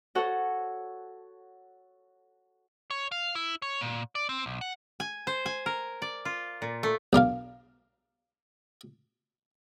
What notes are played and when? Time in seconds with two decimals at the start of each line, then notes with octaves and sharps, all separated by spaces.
0.15 F#4 A4 C#5 F#5
2.91 C#5
3.12 F5
3.35 E4
3.62 C#5
3.81 A#2
4.15 D5
4.29 C4
4.46 B1
4.61 F#5
5.00 G#5
5.27 C5
5.46 G#5
5.66 A#4
6.02 D5
6.25 F4
6.62 A#2
6.83 A3
7.13 B1 D4 A#4 F5